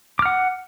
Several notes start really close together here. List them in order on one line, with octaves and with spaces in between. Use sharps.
D6 F6 F#5